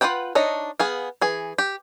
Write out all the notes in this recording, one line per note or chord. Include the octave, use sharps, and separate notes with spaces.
F4 F#4 B4 F#5 G5
D4 D#4 C#5 D#5
B3 G#4 F5
E3 G#4
G4